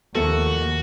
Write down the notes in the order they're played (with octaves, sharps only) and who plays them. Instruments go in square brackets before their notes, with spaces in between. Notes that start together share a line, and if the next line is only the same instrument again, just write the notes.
[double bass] D#2 [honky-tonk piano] F3 A3 A#3 [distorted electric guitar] F#4 [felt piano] A4